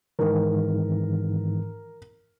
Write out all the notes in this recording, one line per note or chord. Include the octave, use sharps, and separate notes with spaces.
G#2 D#3 E3 A#4